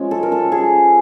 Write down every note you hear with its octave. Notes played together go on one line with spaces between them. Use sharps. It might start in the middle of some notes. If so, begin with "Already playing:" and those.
Already playing: F3 G#3 C#4
A4
A#4
A4
G#4